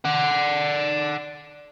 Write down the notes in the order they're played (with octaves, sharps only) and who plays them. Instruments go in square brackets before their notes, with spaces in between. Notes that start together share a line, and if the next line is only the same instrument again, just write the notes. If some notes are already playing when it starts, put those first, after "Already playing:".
[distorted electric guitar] D5 F#5